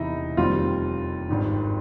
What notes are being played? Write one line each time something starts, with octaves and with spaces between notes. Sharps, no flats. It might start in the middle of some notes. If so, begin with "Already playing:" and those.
Already playing: E1 E2 C3 D#4 E4
F1 D#2 D#3 G3 C4 F4
G#1 G2 D#3